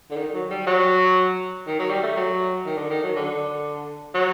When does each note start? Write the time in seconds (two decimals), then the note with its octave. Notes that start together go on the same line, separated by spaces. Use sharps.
0.11 D3
0.17 D#3
0.34 F#3
0.51 G3
0.67 F#3
1.66 D#3
1.79 F#3
1.91 G3
2.03 A3
2.16 F#3
2.66 D#3
2.78 D3
2.90 D#3
3.03 F#3
3.16 D3
4.15 F#3